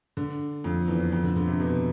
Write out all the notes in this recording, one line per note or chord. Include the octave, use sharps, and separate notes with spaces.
D3
F2
E2
F2
D3
D3
C3
B2